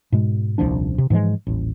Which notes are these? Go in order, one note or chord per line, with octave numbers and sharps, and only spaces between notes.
G#2 B2 G#3
D#1 C2 F3 D4
C3
G#2 E3 F3 G#3
D#1 A1